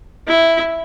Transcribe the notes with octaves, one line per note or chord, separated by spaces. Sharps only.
E4